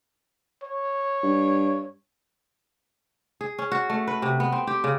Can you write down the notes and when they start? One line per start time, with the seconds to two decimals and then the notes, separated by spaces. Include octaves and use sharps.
0.63 C#5
1.23 G2
3.41 G#4
3.59 C#4
3.72 F#4
3.90 A3
4.08 B4
4.22 C3
4.40 B3
4.52 C4
4.67 G4
4.84 C#3